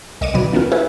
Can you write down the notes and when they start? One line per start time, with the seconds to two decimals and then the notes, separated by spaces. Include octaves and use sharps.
0.21 C2 D#5 C#6 D6 D#7
0.34 D#2 B2 F#3 B4 D5 D#7
0.52 E3 A#3 B3 C#4 F4
0.72 E4 F4 G#4 B4 C#5